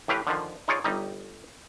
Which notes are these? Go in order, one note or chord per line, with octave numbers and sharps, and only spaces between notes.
A2 E3 G4 B4 F5
D3 D#3 F3
D#4 F4 G#4 C#5 D5
G1 G3 D#4